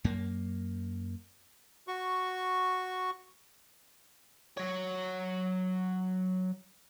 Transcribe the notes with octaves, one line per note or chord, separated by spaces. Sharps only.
F#2 A#3
F#4 C#6
F#3 C#5